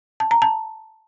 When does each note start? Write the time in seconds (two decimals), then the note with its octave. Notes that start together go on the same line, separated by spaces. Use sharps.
0.20 A5
0.31 A#5
0.42 A5